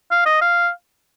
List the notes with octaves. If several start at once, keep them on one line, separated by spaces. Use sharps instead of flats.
F5
D#5
F5